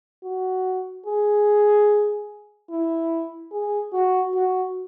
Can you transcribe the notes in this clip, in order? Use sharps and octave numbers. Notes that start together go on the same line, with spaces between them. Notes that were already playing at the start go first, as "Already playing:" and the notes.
F#4
G#4
E4
G#4
F#4
F#4